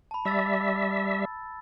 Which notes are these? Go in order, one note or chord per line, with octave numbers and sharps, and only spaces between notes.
A5 B5
G3 E5 B5 E6 A6